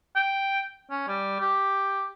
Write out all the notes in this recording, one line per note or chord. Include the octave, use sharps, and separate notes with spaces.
G5
C#4
G3
G4